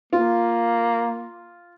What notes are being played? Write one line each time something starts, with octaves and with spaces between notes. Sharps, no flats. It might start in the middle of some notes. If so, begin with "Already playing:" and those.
A#3 F4